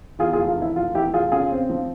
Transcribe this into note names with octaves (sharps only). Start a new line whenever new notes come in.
E2 F4 G#4
F4 G#4
F1
F4
E3 E4
F1 F4
E2 E4 G4
F1 F4 G#4
C#3 F4 G#4
C4
F3